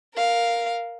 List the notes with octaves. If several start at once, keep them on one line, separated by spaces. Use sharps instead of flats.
A#4 F5